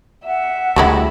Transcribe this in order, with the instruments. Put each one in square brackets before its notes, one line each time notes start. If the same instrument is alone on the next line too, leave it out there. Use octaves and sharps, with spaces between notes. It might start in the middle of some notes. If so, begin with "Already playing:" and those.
[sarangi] E5 [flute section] F#5
[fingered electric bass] D2 [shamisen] G3 G#3 E4